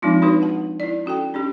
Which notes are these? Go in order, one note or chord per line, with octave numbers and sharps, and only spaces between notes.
F3 G#3 C4 D4 D#4 F4
D4 D#4 F#4 B4 C#5
F#5 A5
E4 D5
C#4 F#4 A4 G5
C#4 D4 G4